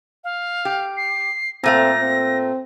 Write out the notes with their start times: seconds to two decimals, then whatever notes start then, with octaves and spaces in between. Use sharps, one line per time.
0.24 F5
0.65 G4
0.97 C7
1.64 A#2 A3 C4 F5 A#6
2.00 C4